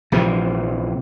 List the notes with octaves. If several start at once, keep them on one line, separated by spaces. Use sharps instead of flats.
A#1 C3 E3 F3